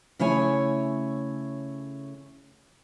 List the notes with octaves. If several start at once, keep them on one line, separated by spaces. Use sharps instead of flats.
C#3 A3 E4 C#5 G#5